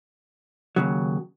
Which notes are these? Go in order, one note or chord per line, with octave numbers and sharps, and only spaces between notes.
D#2 C#3 F#3